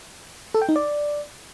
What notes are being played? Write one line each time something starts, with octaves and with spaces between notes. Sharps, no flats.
A4
G5
D#4
D5